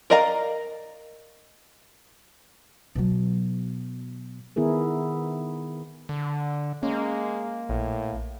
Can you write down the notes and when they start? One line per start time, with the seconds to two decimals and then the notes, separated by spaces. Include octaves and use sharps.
0.10 A#4 D5 D#5 F5 A#5
2.95 B2 F#3
4.56 D#3 B3 E4 G#4 A#4
6.09 D3
6.83 G#3 A#3 C#4
7.69 A#1 A2